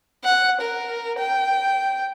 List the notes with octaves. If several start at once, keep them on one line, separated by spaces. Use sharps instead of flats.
F#5
A#4
G5